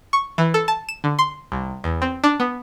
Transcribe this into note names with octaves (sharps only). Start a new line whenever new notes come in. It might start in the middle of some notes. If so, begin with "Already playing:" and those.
C#6
E3
A4
A5
E7
D3
C6
C2
E2
C4
D4
B3